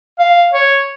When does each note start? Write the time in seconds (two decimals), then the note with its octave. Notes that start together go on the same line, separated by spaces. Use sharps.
0.19 F5
0.54 C#5